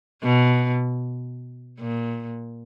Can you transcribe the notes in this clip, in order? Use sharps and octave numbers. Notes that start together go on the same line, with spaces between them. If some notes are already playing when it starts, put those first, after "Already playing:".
B2
A#2